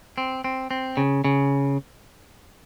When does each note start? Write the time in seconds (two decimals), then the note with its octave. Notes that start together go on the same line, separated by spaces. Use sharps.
0.18 C4
0.44 C4
0.71 C4
0.97 C#3
1.24 C#3